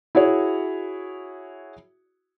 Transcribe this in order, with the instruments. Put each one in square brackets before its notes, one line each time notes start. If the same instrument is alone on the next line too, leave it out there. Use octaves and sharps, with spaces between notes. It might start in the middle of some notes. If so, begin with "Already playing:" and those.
[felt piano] E4 F#4 G#4 C#5